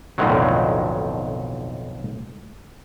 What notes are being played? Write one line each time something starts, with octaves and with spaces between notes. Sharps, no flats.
B1 F2 A2 D3 D#3 F#3